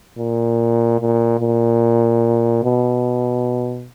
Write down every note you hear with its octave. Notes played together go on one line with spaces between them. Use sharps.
A#2
A#2
A#2
B2